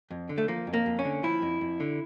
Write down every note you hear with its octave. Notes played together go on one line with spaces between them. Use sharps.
F2
D3
A3
F3 A#3
F2
A#3
F2
C#4
D3
F3 E4
F2
F2
D3